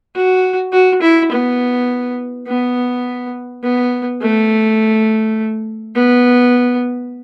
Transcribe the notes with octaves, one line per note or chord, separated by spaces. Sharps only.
F#4
F#4
E4
B3
B3
B3
A3
B3